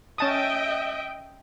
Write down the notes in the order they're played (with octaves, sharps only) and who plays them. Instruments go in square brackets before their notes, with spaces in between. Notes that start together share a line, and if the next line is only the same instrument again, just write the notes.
[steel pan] C#4 A5 D#6 [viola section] D#5 E5 G5